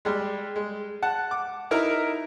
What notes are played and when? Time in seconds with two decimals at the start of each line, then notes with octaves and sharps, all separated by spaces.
0.05 G3 G#3
0.56 G#3
1.03 F#5 A5
1.31 D6
1.71 D#4 E4 A#4 E5 A#5